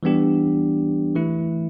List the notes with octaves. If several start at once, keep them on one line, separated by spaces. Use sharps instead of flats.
E3 G3 B3 D4 G4
E3 A3 E4